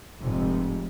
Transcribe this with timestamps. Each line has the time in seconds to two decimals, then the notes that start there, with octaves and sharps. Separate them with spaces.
0.22 F1 G#2 C3